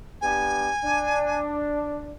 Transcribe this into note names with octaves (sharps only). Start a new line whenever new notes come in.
B3 D4 G4 G#5
D4